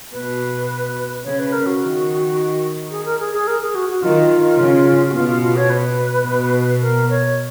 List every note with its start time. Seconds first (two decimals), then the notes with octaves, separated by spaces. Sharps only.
0.13 B2 B4
1.25 C#3 C#5
1.39 B4
1.52 A#4
1.66 F#4
1.81 D#3
2.91 G#4
3.05 A#4
3.19 G#4
3.33 G#4
3.47 A#4
3.62 G#4
3.75 F#4
3.89 F#4
4.02 D#3 F4
4.58 C#3
5.09 F#4
5.14 B2 F4
5.29 F4
5.42 F4
5.56 C#5
5.70 B4
6.25 B2
6.81 A#4
7.10 C#5